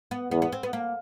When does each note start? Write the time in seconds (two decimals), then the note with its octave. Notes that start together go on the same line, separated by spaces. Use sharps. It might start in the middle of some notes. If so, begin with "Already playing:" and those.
0.11 B3
0.31 E2 B3
0.42 B3
0.52 C4
0.63 B3
0.73 A#3